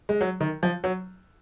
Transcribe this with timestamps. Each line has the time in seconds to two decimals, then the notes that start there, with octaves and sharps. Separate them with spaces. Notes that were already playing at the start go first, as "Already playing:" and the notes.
0.09 G#3
0.21 F#3
0.41 D#3
0.63 F3
0.84 F#3